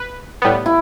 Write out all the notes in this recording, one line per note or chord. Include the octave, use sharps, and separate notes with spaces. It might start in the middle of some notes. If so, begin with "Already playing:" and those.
Already playing: B4
A2 G3 B3
E4